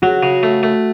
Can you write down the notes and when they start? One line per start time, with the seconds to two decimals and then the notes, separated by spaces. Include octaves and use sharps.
0.02 F#3 F#4
0.23 C#3
0.43 A3
0.63 A3